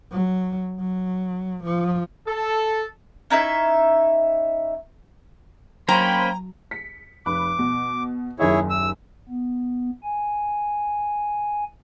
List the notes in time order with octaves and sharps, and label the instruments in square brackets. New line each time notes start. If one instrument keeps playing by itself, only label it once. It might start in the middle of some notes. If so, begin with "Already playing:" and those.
[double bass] F#3
F#3
F3
[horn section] A4
[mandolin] C#4 D#4 E4 E5
[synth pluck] F#3 [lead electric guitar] A#3 C#4 [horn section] C5 G5 B5 [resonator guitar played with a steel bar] A#5
[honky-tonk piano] B6 C#7
[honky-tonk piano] F1 B5 F#6 [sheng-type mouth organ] D6
[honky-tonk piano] B2
[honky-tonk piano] F#1 D#2 E5 [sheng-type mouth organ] E4 G#4 C#5
[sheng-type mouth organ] E6
[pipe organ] B3
G#5